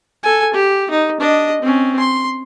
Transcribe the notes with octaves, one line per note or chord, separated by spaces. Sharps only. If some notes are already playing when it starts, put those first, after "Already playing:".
A4 G#5
G4
D#4
D4 D#5
C4 C#4
C6